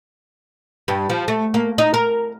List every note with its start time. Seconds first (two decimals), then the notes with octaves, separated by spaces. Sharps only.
0.88 G2
1.10 F3
1.28 A3
1.54 A#3
1.78 D#4
1.94 A#4